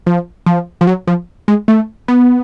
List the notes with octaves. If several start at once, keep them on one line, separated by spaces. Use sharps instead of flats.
F3
F3
F3
F#3
F3
G#3
A3
B3